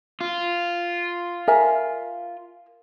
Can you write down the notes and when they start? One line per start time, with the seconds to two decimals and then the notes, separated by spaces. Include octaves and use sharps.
0.21 F4
1.48 A#4 E5 G#5